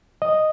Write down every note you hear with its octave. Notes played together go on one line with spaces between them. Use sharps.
D#5